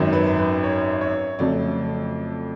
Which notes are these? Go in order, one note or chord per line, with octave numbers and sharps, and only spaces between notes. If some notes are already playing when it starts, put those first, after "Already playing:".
Already playing: G#1 F#2 D#3 F#3
B4
B4
C#5
C#5
F2 C#3 F#3 A3 D5